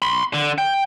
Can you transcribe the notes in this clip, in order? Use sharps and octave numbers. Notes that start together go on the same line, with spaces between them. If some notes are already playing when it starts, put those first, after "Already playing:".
B5 C6
D3
G5